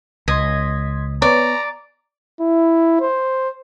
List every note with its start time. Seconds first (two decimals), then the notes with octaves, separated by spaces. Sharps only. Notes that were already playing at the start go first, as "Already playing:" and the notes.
0.28 C#2 D#5 C6 G#6 B6
1.22 B3 B4 C#5 D5 A#5
2.41 E4
3.01 C5